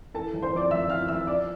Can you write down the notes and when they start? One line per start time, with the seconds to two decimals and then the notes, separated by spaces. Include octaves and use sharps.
0.14 E3 A4 A5
0.33 G1
0.42 C5 C6
0.53 F2 D5 D6
0.70 G1 E5 E6
0.90 E3 F5 F6
1.08 G1 E5 E6
1.27 F3 D5 D6